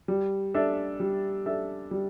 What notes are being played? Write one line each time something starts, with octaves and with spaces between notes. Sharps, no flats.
G3
D4 A4 E5
G3
D4 A4 E5
G3